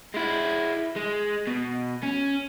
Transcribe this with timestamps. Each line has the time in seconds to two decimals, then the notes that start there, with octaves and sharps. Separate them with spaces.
0.14 G#3 E4
0.96 G#3
1.47 B2
2.03 C#4